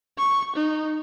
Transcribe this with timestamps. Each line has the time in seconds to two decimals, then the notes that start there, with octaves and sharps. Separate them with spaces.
0.18 C#6
0.56 D#4